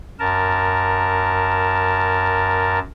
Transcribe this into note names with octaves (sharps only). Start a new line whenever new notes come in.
F#2 A#4 A5